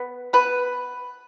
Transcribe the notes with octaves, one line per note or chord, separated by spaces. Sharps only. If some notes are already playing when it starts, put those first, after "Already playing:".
Already playing: B3
B3 B4